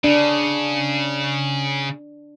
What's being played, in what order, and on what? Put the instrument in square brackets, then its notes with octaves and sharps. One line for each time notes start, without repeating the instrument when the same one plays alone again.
[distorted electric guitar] C#3 [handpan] D4